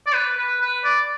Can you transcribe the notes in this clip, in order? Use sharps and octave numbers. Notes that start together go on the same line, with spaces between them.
D5
B4
B4
B4
D5